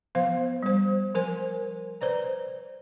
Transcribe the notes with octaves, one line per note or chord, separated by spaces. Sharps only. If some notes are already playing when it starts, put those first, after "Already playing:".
F3 B3 C5 F5
G3 C5
F3 A#4 C5 G#5
B4 C5 D5 A#5